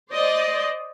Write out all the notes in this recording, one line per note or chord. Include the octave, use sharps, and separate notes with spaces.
C5 D5 D#5